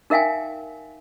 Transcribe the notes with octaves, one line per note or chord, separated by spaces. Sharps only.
D#4 A#4 E5 F5 G5 G#5